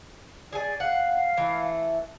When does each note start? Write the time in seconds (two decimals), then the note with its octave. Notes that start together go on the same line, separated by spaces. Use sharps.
0.53 G#4 D5 G#5
0.80 F5 F#5
1.37 E3 A3